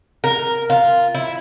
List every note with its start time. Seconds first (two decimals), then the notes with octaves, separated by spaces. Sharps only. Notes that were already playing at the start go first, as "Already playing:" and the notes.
0.24 A#4
0.70 F4
1.14 E4